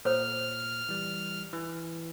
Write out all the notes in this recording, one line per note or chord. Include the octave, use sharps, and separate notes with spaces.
A#2 A4 C5 C#5 F6
E3 G3
E3